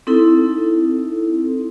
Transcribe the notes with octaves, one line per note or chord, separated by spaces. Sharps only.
C4 D#4 E4 A4